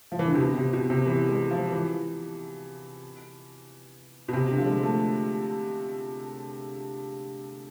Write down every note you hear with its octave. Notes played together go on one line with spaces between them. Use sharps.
F3
E3
D3
C3
B2
C3
B2
C3
E3
G#3
F3
E3
B2
C3
D3
F3
G#3
A3